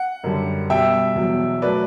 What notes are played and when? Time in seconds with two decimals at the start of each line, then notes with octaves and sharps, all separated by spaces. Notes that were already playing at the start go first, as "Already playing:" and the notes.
Already playing: F#5
0.24 F#2 D3 G3
0.70 B2 G3 E5 G5
1.15 E2 B2 F#3
1.62 F#3 A3 B4 D5